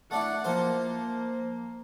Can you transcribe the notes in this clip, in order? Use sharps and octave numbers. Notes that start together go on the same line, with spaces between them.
A3 D4 E4 F#5
F3 A#3 C5